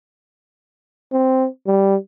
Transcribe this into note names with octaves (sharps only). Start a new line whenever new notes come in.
C4
G3